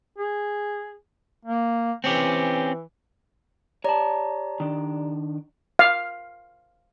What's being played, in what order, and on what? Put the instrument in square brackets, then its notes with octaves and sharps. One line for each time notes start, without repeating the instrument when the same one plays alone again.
[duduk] G#4
A#3
[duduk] E3 [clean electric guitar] C4 C#4 G4
[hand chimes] G4 D5 A#5 [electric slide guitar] C#5 A5
[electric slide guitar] D#3 D4
[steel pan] F5